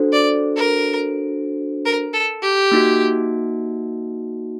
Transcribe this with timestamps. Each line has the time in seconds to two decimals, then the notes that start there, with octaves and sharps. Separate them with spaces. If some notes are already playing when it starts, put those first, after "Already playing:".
Already playing: D4 F#4 A4 C5
0.13 D5
0.57 A#4
1.85 A#4
2.14 A4
2.42 G4
2.71 A#3 D#4 F#4